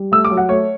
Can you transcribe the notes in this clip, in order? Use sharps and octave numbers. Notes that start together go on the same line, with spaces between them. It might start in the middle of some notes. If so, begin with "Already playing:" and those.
Already playing: G3
A3 E6
D6
F#3
F#5
A3 C#5